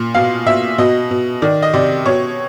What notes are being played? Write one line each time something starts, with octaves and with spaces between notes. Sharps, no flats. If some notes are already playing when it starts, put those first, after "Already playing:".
Already playing: A#2
B2 F5
B2 E5
B2 D#5
B2
D#3 D5
D#5
C3 D5
B2 C#5